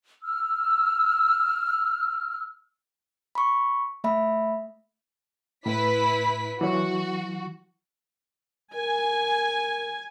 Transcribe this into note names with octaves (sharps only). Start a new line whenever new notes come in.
E6 F6
B5 C#6
A3 E5 B5
A2 E4 B4 B6
E3 F#3 F#4
A#4 G#5